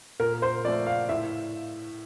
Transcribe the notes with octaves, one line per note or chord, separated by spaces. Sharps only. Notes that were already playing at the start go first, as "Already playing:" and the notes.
A#2 A#4
C5
F3 A3 D5
F5
A2 E5